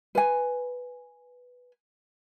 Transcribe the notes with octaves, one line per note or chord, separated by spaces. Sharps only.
B4 G#5